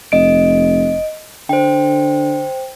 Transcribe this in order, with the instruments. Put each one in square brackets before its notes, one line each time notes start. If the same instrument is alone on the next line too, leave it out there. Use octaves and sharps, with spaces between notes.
[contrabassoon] F1 [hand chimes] D#5 D7
[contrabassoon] D3 [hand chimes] C5 G5